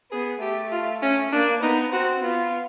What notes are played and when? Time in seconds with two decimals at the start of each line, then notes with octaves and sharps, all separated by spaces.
0.11 B3 G#4
0.42 A3 G4
0.72 F4
1.02 C#4
1.32 A#3 D4
1.62 B3 D#4
1.92 C4 F#4
2.23 B3 F4